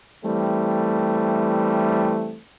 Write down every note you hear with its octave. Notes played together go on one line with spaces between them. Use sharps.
E3 G3 A3 C4